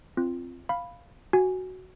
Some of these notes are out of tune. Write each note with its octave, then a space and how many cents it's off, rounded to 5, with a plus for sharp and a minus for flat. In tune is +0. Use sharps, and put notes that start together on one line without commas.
C4 +0 F4 -15
F5 +0 B5 +0
F#4 +5 G#5 -10